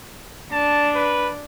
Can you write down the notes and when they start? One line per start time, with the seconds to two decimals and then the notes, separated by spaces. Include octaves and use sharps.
0.53 D4 A5
0.95 B4